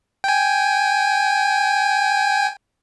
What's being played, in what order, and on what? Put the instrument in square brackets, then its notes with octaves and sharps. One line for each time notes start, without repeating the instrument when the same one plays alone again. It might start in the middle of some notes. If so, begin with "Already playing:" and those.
[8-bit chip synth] G5 G#5